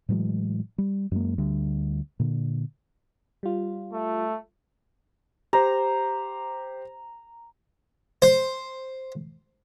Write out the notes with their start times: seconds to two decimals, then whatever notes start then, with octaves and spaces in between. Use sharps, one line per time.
0.09 A2 E3 F#3 G#3
0.78 G3
1.11 F#2 G#3 A#3
1.38 D2 D3 G3
2.20 A#2 D3
3.43 G3 F4
3.93 A3
5.53 G4 C5 A#5
8.22 C5